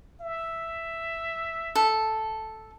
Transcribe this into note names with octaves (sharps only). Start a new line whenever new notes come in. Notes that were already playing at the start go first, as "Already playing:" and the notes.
E5
A4